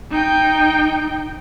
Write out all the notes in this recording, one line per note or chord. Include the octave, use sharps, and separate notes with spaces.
D#4 G5